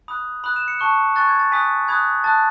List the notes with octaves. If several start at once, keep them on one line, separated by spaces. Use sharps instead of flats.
B5 D#6 F#6
B5 D#6 F#6 F#7
E7
C#7
A5 C#6 F#6
G#5 C#6 F#6 A6
G#6
A6
G#5 D#6 F#6 B6
B5 D#6 F#6 G#6
A5 D#6 F#6 A6